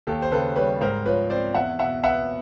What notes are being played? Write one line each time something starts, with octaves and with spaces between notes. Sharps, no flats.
D#2 G4 A4
C5
C#3 A4 B4
G3 B4 C#5
G#2 A#4 C5
F3 B4 C#5
C4 C5 D5
E2 E5 F#5
B2 E5 F#5
B3 E5 F#5